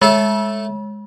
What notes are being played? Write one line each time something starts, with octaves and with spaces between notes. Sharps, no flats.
G#3 A3 A4 A5